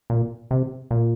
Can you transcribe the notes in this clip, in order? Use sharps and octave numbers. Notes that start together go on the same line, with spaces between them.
A#2
C3
A#2